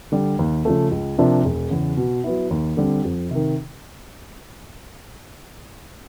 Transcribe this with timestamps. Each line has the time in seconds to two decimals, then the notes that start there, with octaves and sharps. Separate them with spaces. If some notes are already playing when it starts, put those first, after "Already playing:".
0.12 D3 G3
0.39 D#2
0.65 C#3 F3 A3
0.91 C#2
1.18 C3 F3 A#3 D4
1.45 E1
1.71 E2 C#3
1.97 B2
2.24 F#3 B3 E4
2.51 D#2
2.77 D3 G3 C4
3.05 F2
3.31 C3 D#3